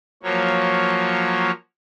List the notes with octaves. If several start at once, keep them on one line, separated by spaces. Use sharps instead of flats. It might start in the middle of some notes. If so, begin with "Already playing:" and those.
F3 F#3 A#3 C#5